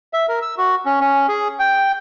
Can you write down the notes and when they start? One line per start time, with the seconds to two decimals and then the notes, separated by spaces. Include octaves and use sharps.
0.13 E5
0.29 A#4
0.42 E6
0.58 F#4
0.86 C#4
1.01 C#4
1.29 G#4
1.59 G5